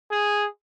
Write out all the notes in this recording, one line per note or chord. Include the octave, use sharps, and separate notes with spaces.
G#4